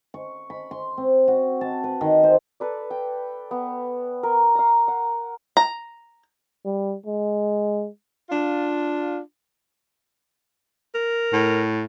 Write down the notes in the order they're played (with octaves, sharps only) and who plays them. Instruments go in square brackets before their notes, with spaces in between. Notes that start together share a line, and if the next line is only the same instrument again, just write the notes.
[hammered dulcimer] C#6
B5
C6
C4
F#4
A5
B4
D#3
C5
[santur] A4 B4 D5
G5
B3
A#4
F5 A#5
F#5
[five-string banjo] A#5
[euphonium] G3
G#3
[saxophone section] D4 F4
[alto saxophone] A#4
[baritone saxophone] A2